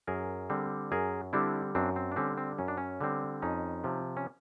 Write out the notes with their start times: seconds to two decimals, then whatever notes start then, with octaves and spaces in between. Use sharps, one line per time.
0.07 F#2 G#4 A#4
0.50 D3 G3 C4
0.92 F#2 G#4 A#4
1.33 D3 G3 C4 D4 E4
1.75 F#2 C4 D4
1.96 C4
2.12 D4
2.16 D3 G3 C4 C#4
2.37 C4
2.58 F#2 C#4
2.68 D4
2.78 C#4
3.01 D3 G3 C4
3.42 F2 C#4 D#4
3.84 C3 F3
4.17 C#4